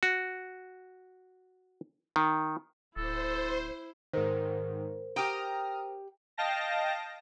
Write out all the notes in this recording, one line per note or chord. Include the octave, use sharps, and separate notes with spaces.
F#4
D#3
D1 E4 A4 C5
G#2 D#3 A#4 C5
G4 G5 A#5 D#6 F6
D#5 F5 G5 A5 A#6